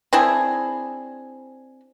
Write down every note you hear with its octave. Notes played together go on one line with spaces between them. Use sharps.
C4 D4 E4 G#4